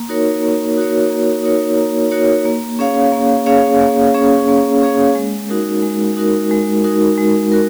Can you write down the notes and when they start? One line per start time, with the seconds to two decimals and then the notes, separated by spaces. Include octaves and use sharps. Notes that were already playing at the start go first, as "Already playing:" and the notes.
Already playing: A#3
0.09 D#4 F#4 A#4 C#5
0.42 A#3
0.77 D#4 F#4 A#4 C#5
1.10 A#3
1.43 D#4 F#4 A#4 C#5
1.77 A#3
2.11 D#4 F#4 A#4 C#5
2.45 A#3
2.79 C#4 G#4 C#5 F5
3.12 A#3
3.46 C#4 G#4 C#5 F5
3.80 A#3
4.14 C#4 G#4 C#5 F5
4.48 A#3
4.82 C#4 G#4 C#5 F5
5.15 G#3
5.49 D#4 F#4 A#4
5.83 G#3
6.17 D#4 F#4 A#4
6.51 G#3
6.84 D#4 F#4 A#4
7.18 G#3
7.52 F#4 A#4